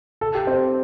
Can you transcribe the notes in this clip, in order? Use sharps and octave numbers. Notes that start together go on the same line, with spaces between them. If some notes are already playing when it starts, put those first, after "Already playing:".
A4
G4
C4